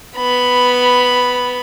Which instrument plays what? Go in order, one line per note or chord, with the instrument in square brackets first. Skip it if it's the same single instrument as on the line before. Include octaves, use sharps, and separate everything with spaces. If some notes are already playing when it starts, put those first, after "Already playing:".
[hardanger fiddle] B3 B5